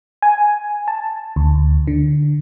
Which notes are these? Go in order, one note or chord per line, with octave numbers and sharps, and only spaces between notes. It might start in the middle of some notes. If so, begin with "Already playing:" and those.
G#5
A5
D2
D3